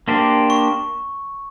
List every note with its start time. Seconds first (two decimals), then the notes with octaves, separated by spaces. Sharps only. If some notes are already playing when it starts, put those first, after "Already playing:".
0.08 A#3 D4 G4 C5
0.50 C#6